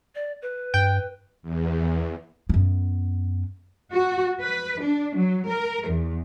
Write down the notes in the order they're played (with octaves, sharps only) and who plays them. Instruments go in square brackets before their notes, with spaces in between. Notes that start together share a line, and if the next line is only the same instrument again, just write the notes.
[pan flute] D5
B4
[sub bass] G2 [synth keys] G5
[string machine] E2
[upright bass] F#2 B3
[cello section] F#4
B4
D4
F#3
A#4
E2